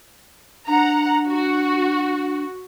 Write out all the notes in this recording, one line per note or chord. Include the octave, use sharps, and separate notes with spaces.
D4 F#5 A#5
F#4